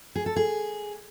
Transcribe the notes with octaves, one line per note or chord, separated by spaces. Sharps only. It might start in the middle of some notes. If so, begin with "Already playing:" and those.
G#4
A4
G#4